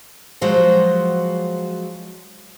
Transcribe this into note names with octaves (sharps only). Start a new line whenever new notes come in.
F3 F#3 G#3 F#4 C5